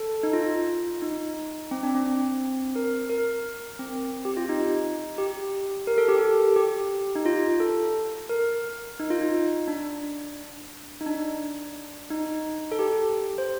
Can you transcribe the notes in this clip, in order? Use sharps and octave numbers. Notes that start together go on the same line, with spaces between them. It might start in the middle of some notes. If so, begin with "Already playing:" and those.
Already playing: A4
D#4
F4
D#4
C4
D4
C4
A#4
A#4
C4
G4
F4
D#4
G4
A#4
A4
G4
A4
G4
D#4
F4
A4
A#4
D#4
F4
D#4
D4
D#4
D4
D#4
A4
G4
C5